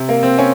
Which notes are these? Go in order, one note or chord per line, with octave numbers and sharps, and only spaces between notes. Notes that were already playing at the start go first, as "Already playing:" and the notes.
Already playing: C3
A#3
C4
C#4